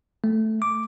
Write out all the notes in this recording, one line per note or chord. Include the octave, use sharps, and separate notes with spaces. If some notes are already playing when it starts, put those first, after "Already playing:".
A3
D6